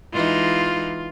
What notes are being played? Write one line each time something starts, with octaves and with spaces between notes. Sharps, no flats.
E3 G#3 D#4 F4